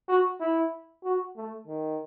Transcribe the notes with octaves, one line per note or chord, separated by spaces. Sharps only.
F#4
E4
F#4
A3
D#3